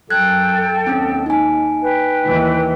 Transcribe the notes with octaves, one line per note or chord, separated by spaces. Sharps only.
F#2 A4 G5 A5 F#6 G#6
D#2 C4 C#4
D#4 G#5
B4 G5
D#2 E3